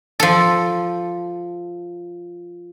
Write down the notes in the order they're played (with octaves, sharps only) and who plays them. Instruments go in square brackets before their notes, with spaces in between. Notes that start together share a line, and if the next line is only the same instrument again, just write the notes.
[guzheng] F3 A4